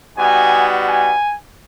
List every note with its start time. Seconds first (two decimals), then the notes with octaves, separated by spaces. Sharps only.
0.17 G3 B3 D#4 F#4 G#5
0.86 G#5